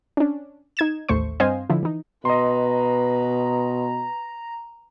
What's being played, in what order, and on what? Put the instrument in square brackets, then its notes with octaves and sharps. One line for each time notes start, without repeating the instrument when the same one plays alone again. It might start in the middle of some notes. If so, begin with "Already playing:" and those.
[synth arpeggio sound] C#4 D4
D#4 G#6 E7
A1 D#2 A3 C5 C#6
G2 C4 C5 D#5 F5 G#5
D3 F3 E4
E3 D#4
[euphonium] B2 [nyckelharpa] B4 [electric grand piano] D#5 C6 [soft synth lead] A#5